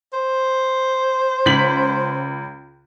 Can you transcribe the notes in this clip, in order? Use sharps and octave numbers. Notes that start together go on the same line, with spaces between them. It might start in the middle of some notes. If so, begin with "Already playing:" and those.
C5
C#2 B6 F#7